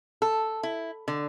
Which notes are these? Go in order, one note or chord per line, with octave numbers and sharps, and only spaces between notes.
A4
E4
D3